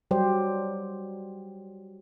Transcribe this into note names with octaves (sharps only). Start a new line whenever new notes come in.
F#3 G3 G4 C5